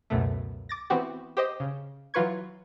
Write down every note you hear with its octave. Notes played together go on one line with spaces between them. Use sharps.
C#2 F#2 B2 A3
D6 A6 A#6
E3 B3 C4 F#4 G4
G4 C5 D#5
C#3
E3 F#3 F4 B4 C#6 G#6